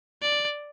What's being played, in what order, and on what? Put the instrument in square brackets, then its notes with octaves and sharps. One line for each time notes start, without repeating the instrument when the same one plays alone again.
[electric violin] D5